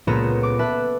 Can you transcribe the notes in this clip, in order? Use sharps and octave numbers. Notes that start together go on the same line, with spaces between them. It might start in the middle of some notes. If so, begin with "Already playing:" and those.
C#2 A#2 B3 A4 A#5 E7
D6
B4 E5 A5 B5 F#6